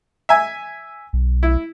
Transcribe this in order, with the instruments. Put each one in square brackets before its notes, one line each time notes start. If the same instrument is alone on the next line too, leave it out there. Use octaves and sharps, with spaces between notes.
[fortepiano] E5 G#5
[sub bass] B1
[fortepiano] E4